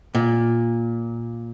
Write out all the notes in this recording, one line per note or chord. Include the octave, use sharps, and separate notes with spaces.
A#2